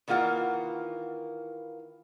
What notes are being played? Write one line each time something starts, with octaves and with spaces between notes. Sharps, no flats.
D#3 E3 A#3 F4 F#5